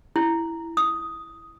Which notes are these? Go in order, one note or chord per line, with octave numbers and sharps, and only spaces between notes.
E4
D#6